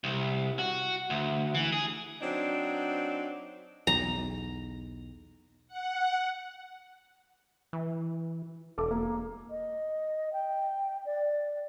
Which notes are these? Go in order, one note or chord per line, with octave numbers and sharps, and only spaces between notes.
C2
F#4
D2
E3
G#4
F#3 C4 D4 D#4
B1 E2 A#5
F#5
E3
E1 A4 D6
A#3
D#5
G5
D5